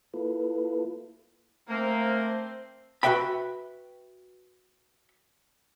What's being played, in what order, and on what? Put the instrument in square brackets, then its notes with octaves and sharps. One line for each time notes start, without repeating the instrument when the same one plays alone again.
[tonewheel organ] A#3 E4 F4 A4 B4
[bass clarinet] A3 [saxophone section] A#3 [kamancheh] C4 C5
[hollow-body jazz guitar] F#4 B4 E5 G5 B5